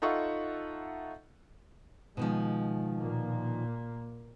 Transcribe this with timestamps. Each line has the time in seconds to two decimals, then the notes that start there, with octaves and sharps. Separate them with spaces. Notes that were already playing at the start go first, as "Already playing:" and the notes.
0.02 D#4 F4 A4 E5 F#5 C#6
2.17 B2 D#3 F3 G#3
3.01 A#2 A#3